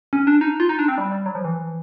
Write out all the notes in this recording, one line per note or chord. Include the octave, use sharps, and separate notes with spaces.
C#4
D4
D#4
F4
D#4
D4
C4
G3
G3
F#3
F3
E3